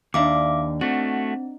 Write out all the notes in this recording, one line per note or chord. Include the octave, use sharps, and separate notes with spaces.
D#2 D4 D#4 E5 F5 D6
A3 C4 F#4